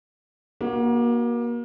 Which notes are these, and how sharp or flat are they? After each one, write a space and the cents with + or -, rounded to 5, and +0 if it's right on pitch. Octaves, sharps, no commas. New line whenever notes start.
A#3 +30 F#4 +5